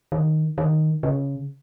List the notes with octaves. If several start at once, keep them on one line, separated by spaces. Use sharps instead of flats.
D#3
D#3
C#3